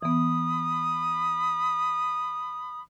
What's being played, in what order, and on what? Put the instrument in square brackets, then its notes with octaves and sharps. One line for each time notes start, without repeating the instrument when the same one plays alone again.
[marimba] E3 B3 [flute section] B5 D#6